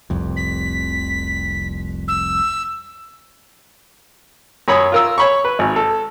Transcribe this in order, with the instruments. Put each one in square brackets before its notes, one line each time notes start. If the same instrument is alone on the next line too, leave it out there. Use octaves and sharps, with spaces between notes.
[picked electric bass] F1 C2 F2
[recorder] B6
E6
[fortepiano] F#2 C#5 B5 D#6
F4 A#4 E6
C#5 B5 C#6
B4
G#1
A4